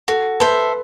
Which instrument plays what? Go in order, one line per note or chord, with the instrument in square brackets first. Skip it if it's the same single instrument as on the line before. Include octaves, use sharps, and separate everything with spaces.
[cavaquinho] F#4 [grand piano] A4
[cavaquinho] A4 C5 E5 [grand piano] B4